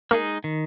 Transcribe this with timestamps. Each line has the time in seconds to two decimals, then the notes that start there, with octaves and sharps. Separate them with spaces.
0.11 G#3 A#3 D#4 G#4
0.44 D#3